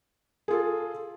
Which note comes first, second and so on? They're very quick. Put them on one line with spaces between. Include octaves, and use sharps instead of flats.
G#4 F4 A4